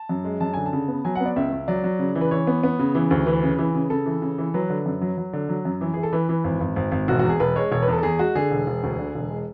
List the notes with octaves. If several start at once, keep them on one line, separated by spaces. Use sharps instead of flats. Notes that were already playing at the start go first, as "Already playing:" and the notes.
Already playing: A5
F#2
G#3
F#2 A5
D3 G#5
A5
C#3
B3
F#3 G#5
F#5
B3
D5
C#2 E5
C#2
F#3 D5
F#3
C#3
E3
B4
E3 C#5
B3
B3
C#3
E3
D2
E3 B4
C#3
E3
C#3
C#3 A4
E3
C#3
E3
F#3 B4
D3
F#2
F#3
F#3
D3
F#3
F#2
E3
E3 G#4
A4
E3 B4
E3
G#1
G#1
G#1
G#1
E1 F#4
E2 F#4
G#4
E1 B4
G#3 C#5
E1 C#5
B4
E2 A4
A4
E2 G#4
G#3 F#4
D3 G#4
E1
E1
D2
D3
E1
G#3